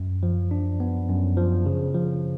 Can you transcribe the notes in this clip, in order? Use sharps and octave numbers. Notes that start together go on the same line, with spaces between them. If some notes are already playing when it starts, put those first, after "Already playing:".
Already playing: F#2
F3
D4
B3
F#2
F3
C#3
F3